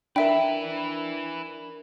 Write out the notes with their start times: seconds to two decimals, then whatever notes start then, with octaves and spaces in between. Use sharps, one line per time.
0.16 D4 E4 A#4 B4 E5 G5